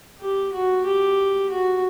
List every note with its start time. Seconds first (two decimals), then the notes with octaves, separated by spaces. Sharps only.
0.21 G4
0.52 F#4
0.85 G4
1.50 F#4